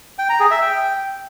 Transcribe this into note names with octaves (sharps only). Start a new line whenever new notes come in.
G5
A#5
G#4
E5
G5